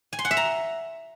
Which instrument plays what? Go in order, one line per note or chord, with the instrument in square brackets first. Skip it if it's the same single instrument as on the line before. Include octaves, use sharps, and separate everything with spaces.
[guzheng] G#5
C6
F#5
E5
A#5